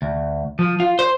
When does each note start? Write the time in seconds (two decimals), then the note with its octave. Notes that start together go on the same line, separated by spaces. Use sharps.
0.02 D2
0.59 F3
0.80 F4
0.99 C5